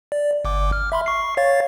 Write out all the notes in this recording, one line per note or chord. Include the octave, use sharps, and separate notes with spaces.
D5
G1 D6
F6
E5 B5 C6
C#6 C7
C#5 F5 A6